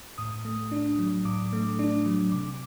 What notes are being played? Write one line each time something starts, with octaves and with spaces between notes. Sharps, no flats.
A2 D#6
A3
D4
F#3
A2 D6
A3
D4
F#3
C3 D6